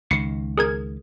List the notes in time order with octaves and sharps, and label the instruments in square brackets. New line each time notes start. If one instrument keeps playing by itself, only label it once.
[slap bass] C#2 D#3 [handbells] C7 C#7
[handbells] G#4 A#4 G#6